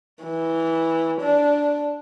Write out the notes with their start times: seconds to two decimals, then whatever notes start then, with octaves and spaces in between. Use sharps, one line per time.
0.23 E3
1.22 D4